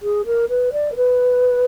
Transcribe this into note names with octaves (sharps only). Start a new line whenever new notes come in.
G#4
A#4
B4
D5
A#4
B4